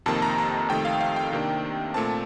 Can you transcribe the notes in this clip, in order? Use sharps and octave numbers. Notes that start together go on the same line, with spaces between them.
F2 C3 D#3 A#3 A5
A#5
A5
F2 C3 D#3 A3 G5
F5
F5
G5
C3 D#3 A#3 D4
A#2 A3 C4 A5